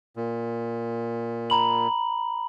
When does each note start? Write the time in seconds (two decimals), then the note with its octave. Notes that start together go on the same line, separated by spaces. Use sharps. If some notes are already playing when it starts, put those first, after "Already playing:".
0.16 A#2
1.50 A#5 B5 F#7